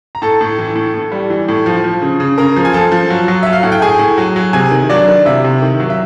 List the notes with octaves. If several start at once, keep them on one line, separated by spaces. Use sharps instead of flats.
A#5
A2 A4 A5
A2
E3
A2
A2
G3
E3
A2
F3
F3
C#3
C#3
C#3 A#4 A#5
F3
G#5
F3 A4 A5
F3
F#3
F#3
F#3 E5
F5
A2 F#5
G5
A2 G#4 G#5
A2
F#3
F#3
C3 G#4 G#5
D#3
F#3 D4 D5
D#3
C3 E4 E5
C3
D#3
F#3
E5